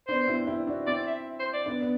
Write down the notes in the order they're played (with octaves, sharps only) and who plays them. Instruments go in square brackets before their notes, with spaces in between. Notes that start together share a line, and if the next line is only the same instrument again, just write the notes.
[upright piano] B3 D4 [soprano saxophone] C5
[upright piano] C4 E4
D4
C4 E4
D4 F#4
[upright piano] C4 E4 [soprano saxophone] D5
[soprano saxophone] E5
C5
D5
[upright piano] B3 D4
B3